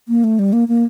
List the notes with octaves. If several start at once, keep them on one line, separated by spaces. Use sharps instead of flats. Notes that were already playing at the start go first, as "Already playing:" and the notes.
A#3
A3
G3
A#3
A#3